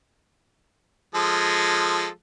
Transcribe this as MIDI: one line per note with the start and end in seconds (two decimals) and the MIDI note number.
1.15 2.07 53
1.15 2.07 56
1.15 2.07 69